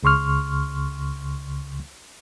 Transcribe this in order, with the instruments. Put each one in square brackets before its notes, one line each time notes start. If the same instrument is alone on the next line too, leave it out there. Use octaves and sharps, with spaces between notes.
[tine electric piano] C#2 C#3 C6 C#6 F6